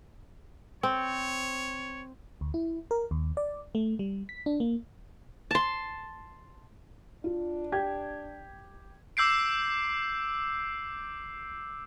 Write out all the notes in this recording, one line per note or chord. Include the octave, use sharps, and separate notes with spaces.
C4 C#5
D2
E4
A#4
D#2
D5
A3
G3
B6
D4
A#3
A5 C6
D4 F4
G4 G#6
D6 E6 G6 C7 D7